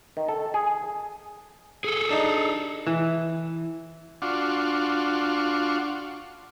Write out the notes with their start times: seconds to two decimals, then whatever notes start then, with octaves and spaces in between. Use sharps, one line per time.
0.17 D#3
0.28 A4
0.54 G#4
1.84 G#4 A4
2.10 D4 D#4
2.86 E3
4.22 D4 F4 F#4